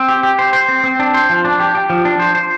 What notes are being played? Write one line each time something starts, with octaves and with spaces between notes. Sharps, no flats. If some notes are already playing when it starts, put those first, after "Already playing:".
Already playing: C4
G4
G4
C5
C5
C4
C4
D4
C5
F3
D4
G4
G4
F3
D4
C5
C5